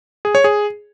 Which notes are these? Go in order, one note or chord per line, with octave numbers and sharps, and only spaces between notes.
G#4
C#5
G#4